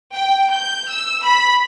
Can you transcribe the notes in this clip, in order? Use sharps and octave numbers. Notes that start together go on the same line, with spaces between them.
G5
G6
E6
B5